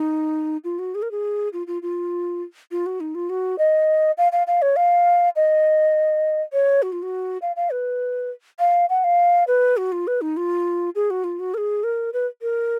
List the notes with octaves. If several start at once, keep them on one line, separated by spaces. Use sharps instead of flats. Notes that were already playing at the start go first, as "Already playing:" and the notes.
Already playing: D#4
F4
F#4
G#4
A#4
G#4
F4
F4
F4
F4
F#4
D#4
F4
F#4
D#5
F5
F5
F5
C#5
F5
D#5
C#5
F#4
F4
F#4
F5
F5
B4
F5
F#5
F5
B4
F#4
F4
B4
D#4
F4
G#4
F#4
F4
F#4
A#4
G#4
A#4
B4
A#4